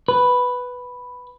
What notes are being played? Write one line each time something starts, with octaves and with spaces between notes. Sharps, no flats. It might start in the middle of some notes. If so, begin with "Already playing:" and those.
B4